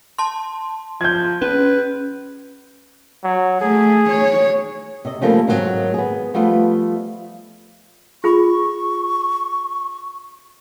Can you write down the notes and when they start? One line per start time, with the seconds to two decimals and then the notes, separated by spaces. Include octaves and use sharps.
0.19 A5 C6
1.01 F3 G6 G#6
1.42 C#4 B4
3.24 F#3
3.61 A3 G#4
4.10 C#5
5.05 C3 D#5
5.21 C#3 F3 G3 A3 A#3 C4
5.48 G#2 D#3 F#3 C4 F#4
5.94 B3 G#4
6.34 F3 G3 A3 B3 F4
8.24 F4 G#4 B5 C#6